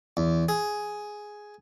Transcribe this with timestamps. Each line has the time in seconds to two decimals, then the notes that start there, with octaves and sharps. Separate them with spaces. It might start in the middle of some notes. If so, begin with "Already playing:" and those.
0.17 E2
0.49 G#4